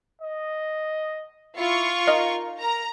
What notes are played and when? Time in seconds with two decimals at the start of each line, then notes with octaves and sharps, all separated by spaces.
0.22 D#5
1.56 E4 F4 C#6
2.07 D#4 A#4 D#5 F5
2.60 A#4 A#5